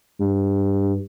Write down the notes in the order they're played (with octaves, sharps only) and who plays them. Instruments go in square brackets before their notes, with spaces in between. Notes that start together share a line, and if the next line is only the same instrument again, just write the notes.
[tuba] G2